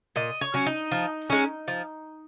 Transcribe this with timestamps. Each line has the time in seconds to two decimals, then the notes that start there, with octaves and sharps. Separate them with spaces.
0.16 A#2 D#5
0.41 C#5
0.54 F#3 C#4
0.66 D#4
0.91 F3
1.30 G#3 C#4
1.68 F3